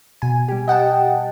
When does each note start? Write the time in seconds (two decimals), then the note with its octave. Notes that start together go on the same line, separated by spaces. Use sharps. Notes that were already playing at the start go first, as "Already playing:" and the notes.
0.22 B2 G#5
0.48 G3 G4
0.68 D#5 F#5 G5 A5